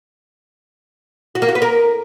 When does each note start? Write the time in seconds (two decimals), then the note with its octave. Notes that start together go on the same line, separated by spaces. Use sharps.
1.35 F#4
1.42 A#3
1.49 F#4
1.55 B4
1.62 A#4